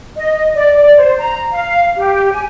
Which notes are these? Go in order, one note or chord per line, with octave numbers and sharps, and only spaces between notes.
D#5
D5
D5
C5
A#5
F5
G4
G#5